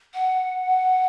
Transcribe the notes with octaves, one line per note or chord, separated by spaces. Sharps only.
F#5